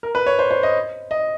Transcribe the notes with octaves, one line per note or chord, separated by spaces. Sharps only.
A#4
B4
C#5
C5
C5
D#5
D#5